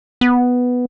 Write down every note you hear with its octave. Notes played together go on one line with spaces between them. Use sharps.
B3